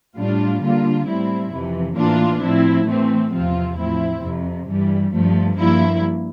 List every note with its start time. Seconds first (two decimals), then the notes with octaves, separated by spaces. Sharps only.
0.17 A2 G3 D4 F4
0.62 D3 G3 A#3 F4
1.07 A2 G3 C4 E4
1.52 F2 C3 E3
1.97 A2 E3 A#3 D4 F4
2.43 A2 F3 C4 E4
2.88 E3 A3 C4
3.33 E2 C3 F3 C4 F4
3.78 A2 F3 C4 E4
4.23 F2 C3 F3
4.68 G2 E3 G3
5.13 G2 F3 A3
5.58 G2 F3 A#3 E4